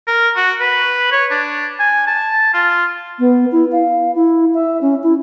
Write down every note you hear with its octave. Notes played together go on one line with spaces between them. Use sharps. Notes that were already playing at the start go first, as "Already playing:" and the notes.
A#4
F#4
B4
C#5
D4
G#5
A5
F4
B3
E4
F5
E4
E5
C#4
E4